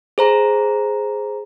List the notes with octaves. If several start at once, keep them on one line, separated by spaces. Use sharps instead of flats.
G#4 C5 A#5